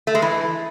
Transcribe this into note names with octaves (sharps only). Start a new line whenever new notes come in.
A3
G#3
E3